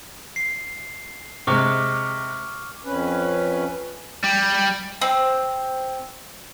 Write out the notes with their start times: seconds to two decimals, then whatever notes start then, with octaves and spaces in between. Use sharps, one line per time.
0.36 C7
1.47 C3 G#3 C#6 D6 F6
2.85 F2 C#4 B4
4.24 G3
5.01 C4